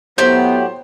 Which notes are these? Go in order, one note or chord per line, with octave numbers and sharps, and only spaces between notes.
A2 F#3 B3 G4 C5 D5